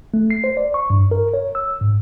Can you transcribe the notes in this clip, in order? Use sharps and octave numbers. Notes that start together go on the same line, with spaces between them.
A3
C7
C5
D5
C#6
G2
A#4
C#5
E6
G#2